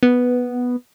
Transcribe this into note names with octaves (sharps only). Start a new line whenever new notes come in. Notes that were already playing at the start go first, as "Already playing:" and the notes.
B3